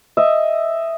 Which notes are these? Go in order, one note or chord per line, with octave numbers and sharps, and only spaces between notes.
D#5 E5